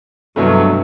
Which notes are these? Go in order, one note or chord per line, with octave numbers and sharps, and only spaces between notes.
C2 G2 B2 F#3 A3